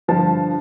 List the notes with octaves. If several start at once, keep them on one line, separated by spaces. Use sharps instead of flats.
G2 D3 F3 A5